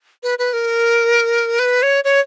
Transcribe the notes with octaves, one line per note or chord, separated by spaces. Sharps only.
B4
B4
A#4
B4
C#5
C#5